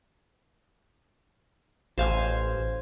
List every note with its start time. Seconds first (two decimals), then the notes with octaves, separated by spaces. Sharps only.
1.98 A1 C5 F5 G#5